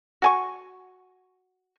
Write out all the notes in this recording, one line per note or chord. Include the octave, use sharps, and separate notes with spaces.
F#4 G#5 C#6